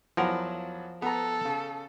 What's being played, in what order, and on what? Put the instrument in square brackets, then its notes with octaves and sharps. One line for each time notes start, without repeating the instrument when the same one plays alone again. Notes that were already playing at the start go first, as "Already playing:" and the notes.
[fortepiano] E2 F#3 F#5 [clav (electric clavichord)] F3 A#4
[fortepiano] B3 A#5 [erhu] A4
[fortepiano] C#3